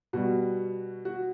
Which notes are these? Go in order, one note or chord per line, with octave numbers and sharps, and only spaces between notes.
B2 G3 F#4
F#4